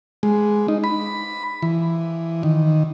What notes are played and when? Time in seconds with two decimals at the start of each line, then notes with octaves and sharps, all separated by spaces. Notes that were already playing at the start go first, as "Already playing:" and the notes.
0.23 G#3
0.68 D#4
0.84 B5
1.62 E3
2.43 D#3